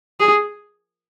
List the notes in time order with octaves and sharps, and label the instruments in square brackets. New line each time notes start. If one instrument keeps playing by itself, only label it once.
[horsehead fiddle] G#4